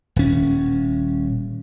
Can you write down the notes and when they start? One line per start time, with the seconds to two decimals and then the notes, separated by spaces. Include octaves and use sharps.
0.16 D#1 C#4